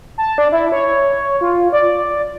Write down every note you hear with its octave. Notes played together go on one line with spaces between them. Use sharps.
A5
D4
E4
C#5
F4
D5